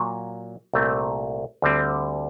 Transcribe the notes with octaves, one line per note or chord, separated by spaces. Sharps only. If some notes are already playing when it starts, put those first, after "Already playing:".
Already playing: A#2 F#3 A#3
C2 A#2 A3 C4
D2 D3 G3 C4